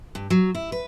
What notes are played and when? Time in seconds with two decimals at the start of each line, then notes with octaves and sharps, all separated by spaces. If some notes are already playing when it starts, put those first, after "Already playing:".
0.15 G2
0.30 F#3
0.55 E4
0.72 B4